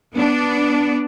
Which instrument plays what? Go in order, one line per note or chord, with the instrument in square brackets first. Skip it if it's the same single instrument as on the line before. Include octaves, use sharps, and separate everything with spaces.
[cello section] B3 D4